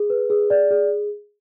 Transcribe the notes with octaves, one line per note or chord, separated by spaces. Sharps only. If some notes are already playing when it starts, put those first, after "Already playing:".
Already playing: G#4
B4
G#4
D5
G#4